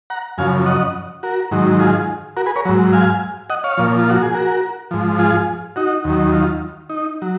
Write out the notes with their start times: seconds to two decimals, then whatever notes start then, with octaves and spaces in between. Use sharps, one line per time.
0.10 F#5 A#5
0.38 F#2 C#3 F3 F5 G#5
0.66 D#5 F#5
1.23 F#4 A#4
1.51 G#2 D#3 F#3
1.79 F4 G#4
2.37 F#4 A#4
2.46 G#4 B4
2.56 A#4 C#5
2.65 G#2 F#3
2.93 F5 G#5
3.50 D#5 F#5
3.64 C#5 F5
3.77 A#2 F3
3.99 F4
4.10 F#4
4.23 G#4
4.35 F#4 A#4
4.91 G#2 F3
5.19 F4 G#4
5.76 D#4 F#4
6.04 D#2 D#3 F#3
6.32 F4
6.89 D#4
7.22 F#3